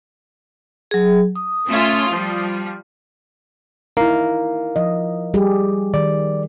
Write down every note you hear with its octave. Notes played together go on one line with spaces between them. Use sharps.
F#3 G#4
D#6
A3 C#4 F4
F3 G3
D#4 E4 A#4 F5
F3 D#5
G3 G4 G#4
D#3 D5